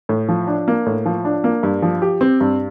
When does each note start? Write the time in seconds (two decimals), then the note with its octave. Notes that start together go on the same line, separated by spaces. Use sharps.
0.09 A2
0.29 F3
0.47 D4
0.68 A#3
0.86 A2
1.06 F3
1.25 D4
1.44 A#3
1.63 G2
1.82 F3
2.02 G4
2.21 C4
2.41 G2